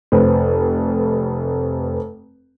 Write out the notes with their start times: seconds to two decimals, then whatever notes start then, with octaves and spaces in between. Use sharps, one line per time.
0.12 F1 B4 C5